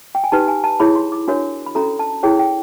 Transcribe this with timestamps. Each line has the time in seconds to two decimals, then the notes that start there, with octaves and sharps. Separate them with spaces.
0.15 G5
0.24 G#5
0.32 D#4 G4 B4 A5
0.48 G#5
0.64 A5
0.80 E4 G#4 C#5 B5
0.95 C6
1.12 D6
1.28 D4 F#4 A#4 C#5
1.66 B5
1.75 C#4 F#4 A4 A#5
1.99 A5
2.23 E4 G#4 C#5 G5
2.39 G5